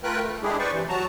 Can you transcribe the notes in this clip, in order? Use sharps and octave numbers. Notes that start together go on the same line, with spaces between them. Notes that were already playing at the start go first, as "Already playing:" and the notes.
A3 F4 A#4 B4 G5 F#6
A3
G#3 D4 E4 G4 G#4
B4 C5 D5 C#6
C3 E3
F#3 F#4 A5 A#5